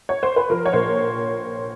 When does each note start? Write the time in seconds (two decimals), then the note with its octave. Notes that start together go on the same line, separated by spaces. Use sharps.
0.09 C#5
0.23 C5
0.36 B4
0.50 F3 A#4
0.66 C#5
0.73 A#1 C5